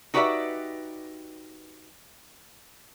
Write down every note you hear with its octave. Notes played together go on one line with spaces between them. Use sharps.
D#4 F#4 G4 B4 D5 E5